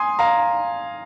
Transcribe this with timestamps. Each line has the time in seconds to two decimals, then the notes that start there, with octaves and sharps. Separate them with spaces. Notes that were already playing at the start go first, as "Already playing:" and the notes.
Already playing: G#5 C6 D#6
0.19 F5 A#5